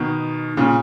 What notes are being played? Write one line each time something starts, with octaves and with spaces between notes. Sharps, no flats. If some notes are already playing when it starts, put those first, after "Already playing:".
Already playing: B2 D#3
A#2 C#3